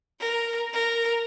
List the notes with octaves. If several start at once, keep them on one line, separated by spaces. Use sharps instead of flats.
A#4
A#4